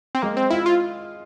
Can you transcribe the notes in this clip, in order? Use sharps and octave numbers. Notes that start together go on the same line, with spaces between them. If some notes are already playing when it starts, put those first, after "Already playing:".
C4
G#3 A#3
C4
E4 F4
F4